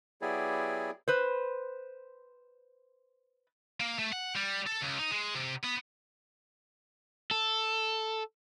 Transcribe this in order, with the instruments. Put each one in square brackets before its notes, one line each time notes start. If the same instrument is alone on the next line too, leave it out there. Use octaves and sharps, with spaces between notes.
[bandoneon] F#3 B3 E4 G4 G#4 D5
[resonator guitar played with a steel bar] B4 C5
[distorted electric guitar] A#3
A3
F#5
G3
A4
C#2
D#4
G#3
C3
B3
[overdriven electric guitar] A4